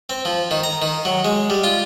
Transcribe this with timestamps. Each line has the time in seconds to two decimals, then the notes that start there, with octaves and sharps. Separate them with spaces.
0.10 C4
0.25 F3
0.51 D#3
0.63 A#5
0.82 D#3
1.05 F#3
1.25 G#3
1.50 G3
1.64 F4